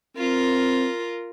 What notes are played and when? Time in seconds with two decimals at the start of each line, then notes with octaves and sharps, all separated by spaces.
0.18 C4 F4 A#4